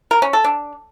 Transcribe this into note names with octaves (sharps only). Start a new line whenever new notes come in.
A#4
C#4
A4
D4